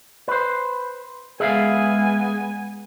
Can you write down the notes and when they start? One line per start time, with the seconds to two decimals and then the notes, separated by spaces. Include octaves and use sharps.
0.28 B4 C5
1.40 G#3 B3 G#4 E5 F5 G#5